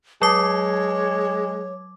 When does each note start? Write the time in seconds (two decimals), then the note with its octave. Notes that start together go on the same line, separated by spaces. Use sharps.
0.22 F#3 G#3 C#5 A5 D6 D#6 C7